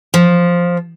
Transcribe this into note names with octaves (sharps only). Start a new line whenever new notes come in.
F3